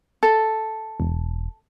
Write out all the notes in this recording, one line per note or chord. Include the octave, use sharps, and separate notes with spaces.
A4
E1